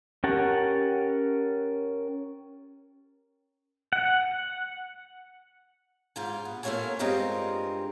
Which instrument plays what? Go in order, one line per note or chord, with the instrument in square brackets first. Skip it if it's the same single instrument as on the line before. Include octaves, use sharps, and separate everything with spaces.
[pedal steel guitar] C#4 G4 A#4 F#5 A5
F#5
[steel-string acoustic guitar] G#2 F4 G#5
B3
A3 A#3 C#4 F4 C#5 G#5
G2 G#3 C4 F4 A#4 D#5